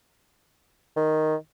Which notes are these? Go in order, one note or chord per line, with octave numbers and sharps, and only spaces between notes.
D#3